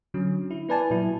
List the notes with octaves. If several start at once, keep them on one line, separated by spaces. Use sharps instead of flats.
D3 F#3 C#4
E4
B3 E4 B4 D5 G#5 A5
A#2 F#3 E4